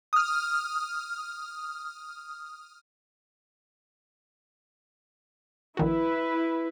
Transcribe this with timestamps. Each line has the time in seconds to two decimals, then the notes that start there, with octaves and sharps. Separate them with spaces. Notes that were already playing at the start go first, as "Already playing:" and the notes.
0.13 D#6 F6
5.77 A#1 D#3 E4 F#4 B4